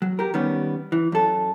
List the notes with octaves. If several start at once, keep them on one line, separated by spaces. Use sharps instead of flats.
F#3
G4 A#4
D#3 G3 B3 C#4
E3
F#2 A4